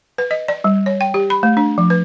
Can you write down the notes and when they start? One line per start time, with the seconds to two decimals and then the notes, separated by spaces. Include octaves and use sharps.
0.18 B4
0.31 D#5
0.48 D5
0.64 G3
0.86 C#5
1.01 G5
1.14 G4
1.30 B5
1.43 A3
1.57 D4
1.78 F3
1.90 B4